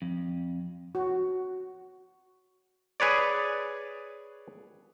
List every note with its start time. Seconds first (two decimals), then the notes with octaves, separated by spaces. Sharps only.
0.02 F2
0.95 F#4
3.00 G#4 B4 C#5 D5